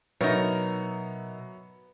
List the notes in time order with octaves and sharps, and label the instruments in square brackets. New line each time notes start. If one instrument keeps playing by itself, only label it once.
[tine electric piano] B2 [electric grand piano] F#3 E5 A6 [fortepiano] B3 C#5 [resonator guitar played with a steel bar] D#4 A#4